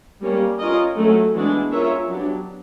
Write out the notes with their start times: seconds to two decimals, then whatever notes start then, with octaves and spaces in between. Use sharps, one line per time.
0.21 G3 A#3 C#4
0.59 C#4 F4 A#4 D#5
0.97 F#3 A3 C#4
1.34 E3 G#3 B3 D4 F#4
1.71 C#4 F4 A#4 C#5 E5
2.09 F#3 B3 D4 G4